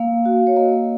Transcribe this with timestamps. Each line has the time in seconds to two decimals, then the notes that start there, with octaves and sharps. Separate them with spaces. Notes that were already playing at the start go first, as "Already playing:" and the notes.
Already playing: A#3 F5
0.25 F#4
0.47 C#5
0.56 A#3 D#5